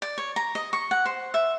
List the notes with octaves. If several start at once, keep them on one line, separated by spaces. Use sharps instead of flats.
D5
C#5
A#5
D#5
C#6
F#5
C5
E5